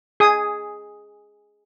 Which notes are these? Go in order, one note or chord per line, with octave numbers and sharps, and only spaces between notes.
G#4 D#6